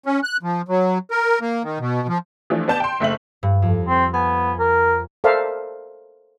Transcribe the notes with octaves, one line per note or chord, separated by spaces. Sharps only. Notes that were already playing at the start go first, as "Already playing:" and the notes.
C#4
F#6
F3
F#3
A#4
A#3
D#3
B2
F3
E3 F3 A3 D4
B3 D5 A5 G6 E7
G5 C6
F#1 A3 E5 F#7
G2
F2
C4
B3 G#5
A#4
A4 A#4 C5 D5 E5 F5